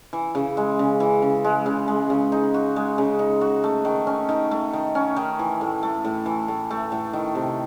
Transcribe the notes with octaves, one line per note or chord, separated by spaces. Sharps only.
E3
C#3
G#3
C#3
E3
C#3
G#3
C#3
G#3
C#3
D#4
F#4
G#3
C#3
D#4
F#4
A3
D#3
C#4
D#3
A3
D#3
C#4
D#3
E3
A2
A3
A2
E3
A2
A3
A2
D#3
C3